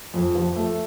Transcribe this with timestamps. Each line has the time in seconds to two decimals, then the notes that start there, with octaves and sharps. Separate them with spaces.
0.14 F2
0.35 F3
0.56 A3